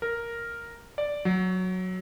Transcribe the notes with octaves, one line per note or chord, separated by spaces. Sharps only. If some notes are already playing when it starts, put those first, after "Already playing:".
A#4
D5
F#3